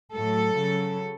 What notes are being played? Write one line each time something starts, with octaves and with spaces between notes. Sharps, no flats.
A2 F#3 A4
C#3 F#3